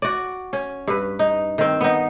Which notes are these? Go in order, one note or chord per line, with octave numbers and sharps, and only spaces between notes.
F#4 D5
C#4
G2 B4
D#4
D#3 C4
B3 D#4